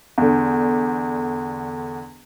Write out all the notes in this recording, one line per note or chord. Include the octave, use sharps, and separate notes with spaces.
E2 D3